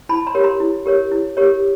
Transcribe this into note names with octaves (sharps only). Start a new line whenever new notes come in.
E4 A5 B5
A#5 C6
G4 A#4 C#5
A#5 C6
E4
G4 A#4 C#5
E4
G4 A#4 C#5